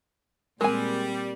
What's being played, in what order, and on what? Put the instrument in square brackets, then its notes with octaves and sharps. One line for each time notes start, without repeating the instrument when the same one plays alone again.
[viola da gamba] A#2 C4 [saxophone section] G3 [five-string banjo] G#3 G#5 [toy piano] A#4